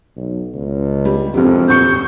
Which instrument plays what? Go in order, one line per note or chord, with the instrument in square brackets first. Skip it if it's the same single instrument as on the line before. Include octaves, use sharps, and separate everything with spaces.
[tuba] B1
C#2
[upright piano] G3
[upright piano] E1 C3 [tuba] F2
[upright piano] D#1 C#6 C#7 [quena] G6